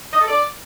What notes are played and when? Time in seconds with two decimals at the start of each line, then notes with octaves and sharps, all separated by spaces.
0.13 D#5
0.21 A4
0.28 D5